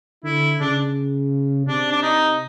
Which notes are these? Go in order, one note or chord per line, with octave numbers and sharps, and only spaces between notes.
D3 E4
C#3 D4
C3 D4
D4
D#4